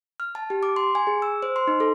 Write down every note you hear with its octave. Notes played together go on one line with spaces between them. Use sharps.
F6
A5
G4
D6
C6
G#5
G#4
E6
C5
C6
D#4
A4